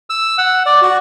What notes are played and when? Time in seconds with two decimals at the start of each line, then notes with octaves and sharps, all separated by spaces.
0.10 E6
0.38 F#5
0.66 D5
0.82 F#4